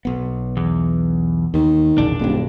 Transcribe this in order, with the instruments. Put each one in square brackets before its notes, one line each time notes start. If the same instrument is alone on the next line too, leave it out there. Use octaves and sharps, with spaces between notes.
[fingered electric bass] B1 B3
[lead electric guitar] E2
[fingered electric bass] D#2 [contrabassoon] D#3
[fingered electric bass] E1 A#1 C#3 [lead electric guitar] D4
[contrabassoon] D#1 [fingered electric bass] B1 G2